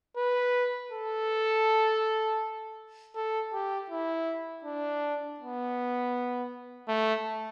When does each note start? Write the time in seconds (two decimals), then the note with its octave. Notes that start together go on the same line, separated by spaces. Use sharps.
0.17 B4
0.92 A4
3.16 A4
3.53 G4
3.90 E4
4.64 D4
5.40 B3
6.88 A3